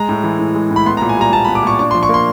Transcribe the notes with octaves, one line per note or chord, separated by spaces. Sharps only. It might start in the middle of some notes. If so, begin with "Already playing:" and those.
Already playing: G#3 A#5
A2
E3
A2
G#3
A2
B5
B3 C6
A#5
A#2
G#5
G3 A#5
A#2 A5
B5
B3
D6
A#2 C#6
D4 C#6
C6
F3
C#6
A#3 C6